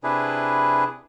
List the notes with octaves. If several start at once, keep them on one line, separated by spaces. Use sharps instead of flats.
C3 D4 E4 G#4 B4